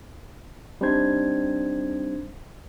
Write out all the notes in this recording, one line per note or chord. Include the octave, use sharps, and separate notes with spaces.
G3 C4 D4 D#4 C5 G#6